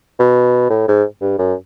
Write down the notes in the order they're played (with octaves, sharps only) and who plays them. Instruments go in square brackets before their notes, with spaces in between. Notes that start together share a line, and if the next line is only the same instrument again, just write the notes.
[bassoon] B2
A2
G#2
G2
F#2